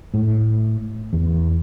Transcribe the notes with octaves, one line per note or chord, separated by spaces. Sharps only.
A2
E2